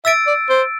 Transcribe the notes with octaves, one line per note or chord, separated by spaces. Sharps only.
E5 E6 A6 D7
D5
C5